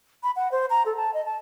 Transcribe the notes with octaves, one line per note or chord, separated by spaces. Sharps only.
B5
F#5
C5
A#5
A4
A5
D#5
A5